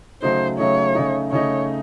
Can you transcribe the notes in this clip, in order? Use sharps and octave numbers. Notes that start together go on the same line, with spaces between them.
C#3 F#3 A3 D#4 C5
C#3 F#3 A3 D#4 C#5
C#3 A3 D#4
C#3 A3 D#4 C#5